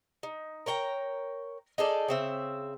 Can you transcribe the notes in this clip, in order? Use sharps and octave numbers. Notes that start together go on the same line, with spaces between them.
D#4
A#4 C#5 G5 A#5
D#4 G#4 A4 D5
C#3 C4 E5